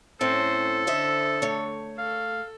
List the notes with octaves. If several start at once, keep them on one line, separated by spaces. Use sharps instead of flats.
A2 C4 C#4 A4 C5
D3 C5 D#5 E5
A3 C#5
A4 F5